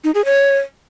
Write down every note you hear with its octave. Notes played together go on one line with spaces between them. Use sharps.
D#4
G#4
C#5